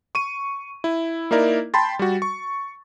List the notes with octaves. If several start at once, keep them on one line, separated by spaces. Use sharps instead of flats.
C#6 D#7
E4
A#3 D#4 E4 A#4 D5
G5 A5 B5 C6 A6
G3 F#4
C#6